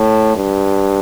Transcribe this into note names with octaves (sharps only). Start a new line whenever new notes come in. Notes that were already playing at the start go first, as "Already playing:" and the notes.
Already playing: A2
G2